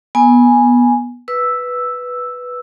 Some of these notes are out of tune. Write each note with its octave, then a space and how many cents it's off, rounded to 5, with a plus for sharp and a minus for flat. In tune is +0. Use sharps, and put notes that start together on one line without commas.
B3 -15 G#5 +0
B4 +0 E6 +0